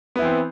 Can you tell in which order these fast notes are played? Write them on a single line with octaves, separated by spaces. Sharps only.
B3 E4 E3 C4